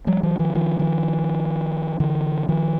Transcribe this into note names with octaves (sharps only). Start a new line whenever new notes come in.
F3 G3
E3 F#3
D#3 F3
D#3 F3
D#3 F3
D3 E3
D#3 F3